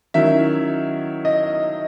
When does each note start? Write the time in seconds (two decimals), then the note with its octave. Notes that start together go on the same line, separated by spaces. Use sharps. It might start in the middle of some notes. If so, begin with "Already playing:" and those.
0.14 D#3 F#3 C#4 E4 E5
1.25 D#5